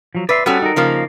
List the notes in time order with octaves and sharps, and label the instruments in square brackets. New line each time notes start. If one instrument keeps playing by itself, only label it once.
[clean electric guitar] F3 F#3
[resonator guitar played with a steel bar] B4 [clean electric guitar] D5 E5 C6
[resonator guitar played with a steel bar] G3 F#4 A4 [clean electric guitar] B3 C#4 C5
[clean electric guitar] D#4 A#4
[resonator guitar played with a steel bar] C#3 F3 A#3